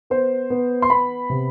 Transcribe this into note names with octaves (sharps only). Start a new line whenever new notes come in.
B3 C5
B3
C6
B3 B5
C3